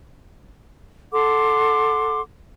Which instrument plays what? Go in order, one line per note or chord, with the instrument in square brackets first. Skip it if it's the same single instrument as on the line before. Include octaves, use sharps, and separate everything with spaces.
[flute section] A4 F#5 C6 D6